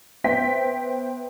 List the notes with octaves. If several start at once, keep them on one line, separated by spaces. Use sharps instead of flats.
B3 C5 E5 G5 B6